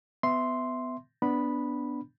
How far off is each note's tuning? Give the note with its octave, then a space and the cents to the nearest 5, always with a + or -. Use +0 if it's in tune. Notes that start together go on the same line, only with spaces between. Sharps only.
B3 +25 E5 +0 C6 +0
B3 +5 D4 +0 B5 -5